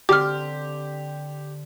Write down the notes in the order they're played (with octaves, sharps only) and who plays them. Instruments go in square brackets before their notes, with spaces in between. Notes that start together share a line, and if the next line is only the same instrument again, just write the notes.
[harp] D3 C4 [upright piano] G4 [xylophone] D6 F6